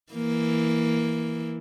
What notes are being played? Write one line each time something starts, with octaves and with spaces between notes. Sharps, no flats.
E3 A#3